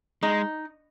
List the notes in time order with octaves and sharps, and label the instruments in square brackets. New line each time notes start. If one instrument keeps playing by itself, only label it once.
[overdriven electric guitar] G#3 [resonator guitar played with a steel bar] D#4